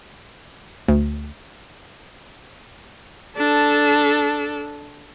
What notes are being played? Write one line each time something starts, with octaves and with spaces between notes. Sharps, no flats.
D2
D4 A4